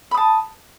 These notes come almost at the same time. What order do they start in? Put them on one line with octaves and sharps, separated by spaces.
B5 D#6 A5